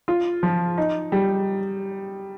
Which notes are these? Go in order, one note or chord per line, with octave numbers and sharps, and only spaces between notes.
F4
F3
D#4
G3